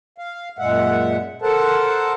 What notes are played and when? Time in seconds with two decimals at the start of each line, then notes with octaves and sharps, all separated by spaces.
0.18 F5
0.59 F#2 A#2 G#3 E5 F#5
1.42 A4 A#4 C5 F#5 A5